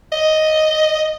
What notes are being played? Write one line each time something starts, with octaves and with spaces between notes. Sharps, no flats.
D#5